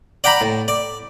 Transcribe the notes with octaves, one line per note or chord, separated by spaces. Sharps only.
D5 F#5 G5 A#5 B5
A2
D5